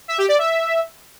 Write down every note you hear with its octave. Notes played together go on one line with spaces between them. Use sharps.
E5
G4
D5
E5